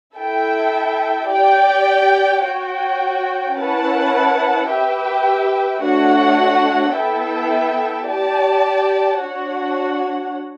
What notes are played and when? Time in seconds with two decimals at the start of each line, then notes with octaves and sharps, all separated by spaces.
0.16 E4 A4 E5 G5
1.29 G4 D5 G5
2.42 F#4 C#5 G5
3.54 C#4 E4 B4 F#5 A5
4.68 G4 B4 E5 G5
5.81 A3 D4 F#4 C#5 F#5
6.93 B3 E4 A4 E5 G5
8.06 G4 D5 A5
9.19 D4 F#4 C#5 F#5